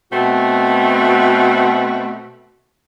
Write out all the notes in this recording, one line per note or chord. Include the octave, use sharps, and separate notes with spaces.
B2 A3 C4 F#4